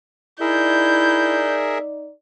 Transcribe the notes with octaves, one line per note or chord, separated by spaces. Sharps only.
D#4 E4 G#4 A#4 D5 E5 G6